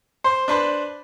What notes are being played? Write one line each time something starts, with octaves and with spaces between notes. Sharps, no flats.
C5
D4 B4 C5